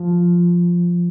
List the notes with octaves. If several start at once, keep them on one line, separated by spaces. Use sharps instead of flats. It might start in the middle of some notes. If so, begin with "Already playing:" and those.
Already playing: F3